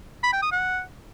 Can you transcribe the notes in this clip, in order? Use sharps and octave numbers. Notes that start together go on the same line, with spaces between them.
B5
G5
D#6
F#5